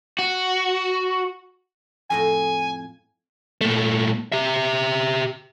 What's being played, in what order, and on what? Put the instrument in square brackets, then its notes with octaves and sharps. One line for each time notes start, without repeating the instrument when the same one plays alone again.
[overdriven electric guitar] F#4
[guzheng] F2 A2 D#5 [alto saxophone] G#5
[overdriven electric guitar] A#2 A3
G4 E5